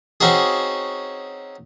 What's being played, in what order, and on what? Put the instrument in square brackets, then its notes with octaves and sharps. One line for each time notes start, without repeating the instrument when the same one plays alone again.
[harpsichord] C4 C#4 D#4 F#4 G#4